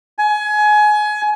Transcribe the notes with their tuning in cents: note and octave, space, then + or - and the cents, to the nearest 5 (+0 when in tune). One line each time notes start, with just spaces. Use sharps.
G#5 +25